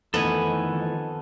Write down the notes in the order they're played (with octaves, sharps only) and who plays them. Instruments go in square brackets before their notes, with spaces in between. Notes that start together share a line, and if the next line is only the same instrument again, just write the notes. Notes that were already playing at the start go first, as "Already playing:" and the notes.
[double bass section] F2 D#3 [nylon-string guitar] E3 A3 D#4 [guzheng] B3 [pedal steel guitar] A4 G#5